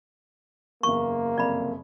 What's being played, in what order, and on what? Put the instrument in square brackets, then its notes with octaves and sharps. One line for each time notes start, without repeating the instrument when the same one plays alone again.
[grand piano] F#1 E2 [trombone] A#3 [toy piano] C#6
[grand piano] F#1 C2 F2 [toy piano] D5 B5